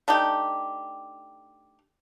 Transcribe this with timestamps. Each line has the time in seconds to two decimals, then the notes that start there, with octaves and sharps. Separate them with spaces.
0.08 A3 D4 D#4 G4